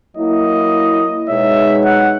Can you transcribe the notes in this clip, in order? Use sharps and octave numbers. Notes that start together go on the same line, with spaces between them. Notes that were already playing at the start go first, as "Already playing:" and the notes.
F#3 A#3 E4 D#5
B2 G#3 D#4 G#4 C#5 E5
F#5